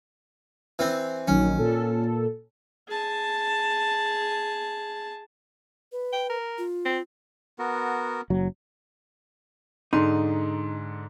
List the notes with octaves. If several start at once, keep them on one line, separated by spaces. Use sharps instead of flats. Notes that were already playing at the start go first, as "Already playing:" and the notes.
E3 C4
A#1 D#3 F#3 C#4
A#2 A4
G#4 A5
B4
G5
A#4
F4
C4
B3 F#4 A#4
F#1 F#3
G#2 D3 D#4 C6